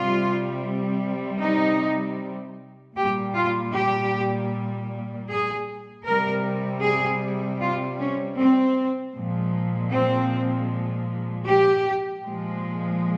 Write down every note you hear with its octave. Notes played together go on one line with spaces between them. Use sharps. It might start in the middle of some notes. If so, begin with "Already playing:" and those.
Already playing: C3 G3 F4
D#4
A#2 G3 G4
F4
G4
G#4
C3 G3 A#4
G#4
F4
C#4
C4
A#2 F3 G#3
C4
G4
A#2 F3 G#3